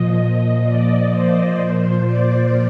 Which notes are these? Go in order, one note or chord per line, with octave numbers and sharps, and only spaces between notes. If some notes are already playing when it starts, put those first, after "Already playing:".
Already playing: A#2 F3 D#5
D#5
D5
C5
A#2 F3
D5